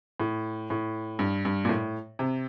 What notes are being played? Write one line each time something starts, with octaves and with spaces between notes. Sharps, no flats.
A2
A2
G2
G2
A#2
A2
C3